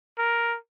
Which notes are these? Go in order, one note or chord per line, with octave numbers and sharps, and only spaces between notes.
A#4